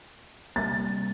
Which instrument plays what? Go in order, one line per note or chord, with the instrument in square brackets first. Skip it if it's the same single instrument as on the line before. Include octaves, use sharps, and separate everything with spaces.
[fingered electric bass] C3 G3 A#3 [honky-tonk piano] A6